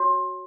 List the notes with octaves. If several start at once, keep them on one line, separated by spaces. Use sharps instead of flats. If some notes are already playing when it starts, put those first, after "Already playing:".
Already playing: F#4 C#5